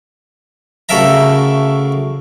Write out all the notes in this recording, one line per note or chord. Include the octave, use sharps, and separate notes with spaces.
D2 C#3 A4 A#4 E5 A#5